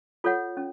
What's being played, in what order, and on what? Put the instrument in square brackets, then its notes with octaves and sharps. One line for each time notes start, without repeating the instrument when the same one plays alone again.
[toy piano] F4 A4 C#5 F#5
C#4